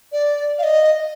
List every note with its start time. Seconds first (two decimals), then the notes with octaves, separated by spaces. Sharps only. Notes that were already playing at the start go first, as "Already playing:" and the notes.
0.12 D5
0.59 F5
0.63 D#5